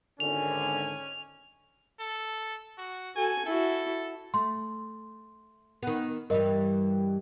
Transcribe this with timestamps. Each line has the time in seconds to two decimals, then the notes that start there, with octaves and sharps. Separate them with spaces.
0.20 G#1 D3 C#4 G#5 F7
1.99 A4
2.78 F#4
3.16 F#4 A4 G#5
3.45 E4 F#4 A4
4.34 A3 C6
5.83 D#3 B3
6.30 G2 E3 G3 A#4 D#5